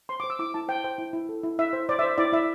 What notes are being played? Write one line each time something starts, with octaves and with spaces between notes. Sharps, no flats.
C5 C6
C5 D6
E6
E4 D6
E4 A5
C5 G5
C5 G5
E4
E4
A4
E4
E4 E5
C5
C5 D5
C5 E5
E4 D5
E4 E5